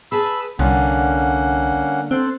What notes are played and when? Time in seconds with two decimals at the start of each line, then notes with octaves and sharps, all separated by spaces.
0.12 G#4 B4 A5 B5 E6
0.59 C2 D3 G3 A#3 C#4 F#5
2.11 C4 A4 C5 F#6